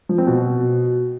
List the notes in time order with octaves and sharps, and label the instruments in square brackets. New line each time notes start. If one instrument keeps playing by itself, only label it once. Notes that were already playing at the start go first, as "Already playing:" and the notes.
[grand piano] F3
C4
B2